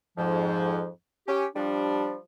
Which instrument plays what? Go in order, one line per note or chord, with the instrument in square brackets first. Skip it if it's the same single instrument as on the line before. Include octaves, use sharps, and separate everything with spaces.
[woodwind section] F2 G#2 F3
C#4 G4
F3 G3 D4